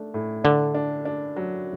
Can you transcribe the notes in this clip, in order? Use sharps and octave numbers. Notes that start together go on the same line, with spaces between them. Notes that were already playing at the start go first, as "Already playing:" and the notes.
Already playing: A3 D4
A2
D3 D4
D4
D4
F#3